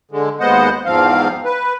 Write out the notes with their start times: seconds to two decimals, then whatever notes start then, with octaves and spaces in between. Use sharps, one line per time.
0.11 D3 G#3
0.40 D#2 G#3 B3 C5 D#5 F#5
0.86 E2 G#2 F3 C4 F5
1.45 B4